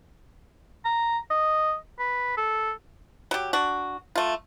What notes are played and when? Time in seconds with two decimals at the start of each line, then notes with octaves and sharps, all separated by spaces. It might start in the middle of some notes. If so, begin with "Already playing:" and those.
0.85 A#5
1.30 D#5
1.99 B4
2.37 A4
3.31 F#3 G4
3.53 D4 F#4
4.16 A3 F4